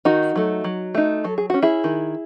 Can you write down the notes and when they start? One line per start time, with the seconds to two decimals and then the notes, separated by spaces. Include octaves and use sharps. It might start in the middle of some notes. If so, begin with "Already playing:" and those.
0.05 D#3 D#4 F#4
0.36 F#3 A3
0.64 F#3
0.95 A3 D#4
1.24 F#3 A4
1.38 G#4
1.50 C#4 F#4
1.62 E4 G#4
1.84 D#3